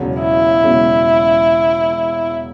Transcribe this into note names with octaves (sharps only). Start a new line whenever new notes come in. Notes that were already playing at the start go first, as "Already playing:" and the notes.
Already playing: E1 E2 C#3 F#3
E4
E1 E2 C#3 F#3